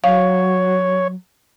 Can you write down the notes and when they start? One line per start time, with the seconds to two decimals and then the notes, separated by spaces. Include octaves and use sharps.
0.04 F#3 C#5 F5